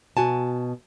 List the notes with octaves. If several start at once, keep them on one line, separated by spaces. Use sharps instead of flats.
B2 F#4 G#5 A5